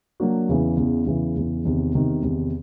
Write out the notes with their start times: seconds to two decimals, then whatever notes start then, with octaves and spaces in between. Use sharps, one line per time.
0.20 F#3 A#3 D4 F#4
0.49 E2 C#3 E3
0.77 E2 C#3 E3
1.07 E2 C#3 E3
1.36 E2 C#3 E3
1.65 E2 C3 D#3
1.95 E2 C3 D#3
2.23 E2 C3 D#3